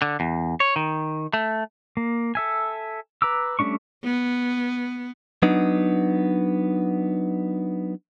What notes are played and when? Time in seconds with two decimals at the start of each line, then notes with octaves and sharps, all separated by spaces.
0.02 D3
0.20 E2
0.60 C#5
0.76 D#3
1.33 A3
1.97 A#3
2.35 A4 E5 G#5
3.22 B4 A#5 D6 E6
3.59 G3 A3 C#4 D4 C#6
4.04 B3
5.42 F#3 B3 D4 D#4